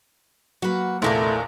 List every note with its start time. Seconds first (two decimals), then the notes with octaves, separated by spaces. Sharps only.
0.62 F#3 A#3 F#4 B4
1.02 A#1 E2 C3 D#3 A3 A#3 D4 E4